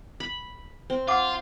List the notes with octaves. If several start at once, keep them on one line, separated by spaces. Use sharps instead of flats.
B5
C4
F4 F#5 D6